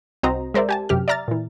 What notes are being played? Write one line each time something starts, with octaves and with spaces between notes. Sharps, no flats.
C2 C4 F#4 C5 D#5 A#5
G#3 A#4 C5 D5 E5
G4 G#5 A5
F#2 C3 G4 F6
D5 E5 A#5 F6 A6
A#2 E3